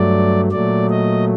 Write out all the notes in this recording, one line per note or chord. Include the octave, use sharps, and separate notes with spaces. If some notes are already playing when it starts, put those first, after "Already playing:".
Already playing: G2 F#3 A3 D5
A#2 F#3 A3 D5
D#5